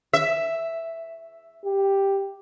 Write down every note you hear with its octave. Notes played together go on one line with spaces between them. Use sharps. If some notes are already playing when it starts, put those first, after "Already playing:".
E5
G4